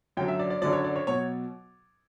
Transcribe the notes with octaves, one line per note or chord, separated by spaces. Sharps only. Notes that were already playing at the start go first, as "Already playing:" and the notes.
F#2 D3 F#3 G5
E5
D5
D5
F#2 D3 F#3 D5
C#5
D5
C#5
B2 F#3 C#5